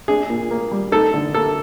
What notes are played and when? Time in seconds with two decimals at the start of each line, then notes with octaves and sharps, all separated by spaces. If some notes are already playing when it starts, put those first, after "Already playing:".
0.08 D4 G#4
0.30 A#2
0.51 A#3
0.71 G3
0.92 D#4 A4
1.14 D3
1.34 A#3 A4